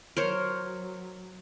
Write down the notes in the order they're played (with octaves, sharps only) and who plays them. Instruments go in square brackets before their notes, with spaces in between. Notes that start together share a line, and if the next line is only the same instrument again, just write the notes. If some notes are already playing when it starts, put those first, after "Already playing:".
[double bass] F#3 [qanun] A#4 C5 C#5